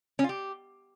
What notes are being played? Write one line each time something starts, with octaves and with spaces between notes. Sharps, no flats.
C#4
F4
G4